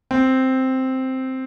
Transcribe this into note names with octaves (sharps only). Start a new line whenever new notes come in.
C4